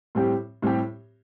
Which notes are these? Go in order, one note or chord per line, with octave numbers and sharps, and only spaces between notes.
A2 G3 C4 G4
A2 G3 C4 G4